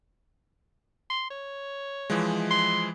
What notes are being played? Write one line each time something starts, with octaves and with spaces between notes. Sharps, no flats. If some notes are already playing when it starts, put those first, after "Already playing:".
C6
C#5
E3 F3 G#3
C6